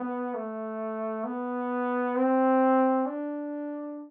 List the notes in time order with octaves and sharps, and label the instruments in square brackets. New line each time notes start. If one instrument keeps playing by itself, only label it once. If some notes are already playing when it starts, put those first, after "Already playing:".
Already playing: [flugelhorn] B3
A3
B3
C4
D4